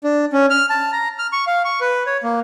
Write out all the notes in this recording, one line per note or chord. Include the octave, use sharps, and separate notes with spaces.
D4
C#4
F6
A5
A#5
F6
C#6
F5
C#6
B4
C#5
A#3